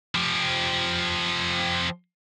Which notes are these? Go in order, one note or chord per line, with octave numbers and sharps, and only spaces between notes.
F3 G4